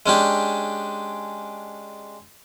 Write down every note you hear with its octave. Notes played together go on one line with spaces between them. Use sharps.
G#3 C#4 D4 G4